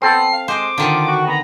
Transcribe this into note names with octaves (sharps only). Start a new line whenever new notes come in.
B3 C4 A4 C7
F5
G#3 C5 D6
D3 D#3 F4
F#4
B3 A#5